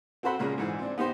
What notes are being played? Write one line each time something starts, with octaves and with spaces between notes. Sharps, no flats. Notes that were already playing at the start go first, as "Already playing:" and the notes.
C4 F#4 A4 C5 F#5 B5
A#2 C#3 G#3 A#3
G#2 E3 G#4
C4 D4
B3 D#4 G4 C5